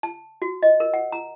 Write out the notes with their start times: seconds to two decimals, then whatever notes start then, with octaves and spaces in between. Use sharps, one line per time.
0.03 A5
0.42 F#4
0.63 D#5
0.80 A#4
0.93 F#5
1.12 A#5